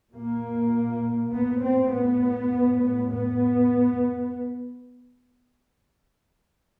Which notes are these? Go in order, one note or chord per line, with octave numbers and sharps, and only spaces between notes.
A#2 A#3
A2 B3
C4
B3
A2
B3